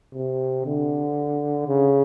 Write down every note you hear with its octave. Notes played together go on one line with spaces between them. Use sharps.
C3
D3
C#3